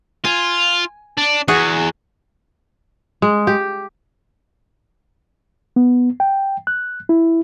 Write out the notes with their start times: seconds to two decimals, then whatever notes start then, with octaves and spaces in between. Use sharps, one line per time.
0.25 F4 G#5
1.18 D4
1.48 E2 F#4 G#4
3.22 G#3
3.47 G4
5.76 B3
6.20 G5
6.67 F#6
7.09 E4